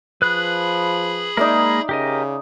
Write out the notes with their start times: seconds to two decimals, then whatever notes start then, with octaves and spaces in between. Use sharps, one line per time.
0.22 F3 G#4 B4 B5 F#6
1.37 G#3 A#3 D#4 A#4 D5 E5
1.89 C#3 G4 A#4 D#5